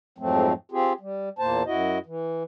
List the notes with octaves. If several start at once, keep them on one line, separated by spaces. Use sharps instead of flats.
F2 G#2 F3 F#3 A3 C4
C4 F4 G4 G#4
G3
E2 A#2 A#3 C5 A5
F#2 E4 F#4 D#5
E3